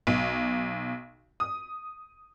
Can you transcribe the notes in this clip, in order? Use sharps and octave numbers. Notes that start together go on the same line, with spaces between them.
B1
D#6